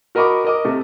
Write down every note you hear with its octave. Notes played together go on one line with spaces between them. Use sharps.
F#4 A#4 D#5 B5 C#6 D6
A#4 D#5 D6
C3 A3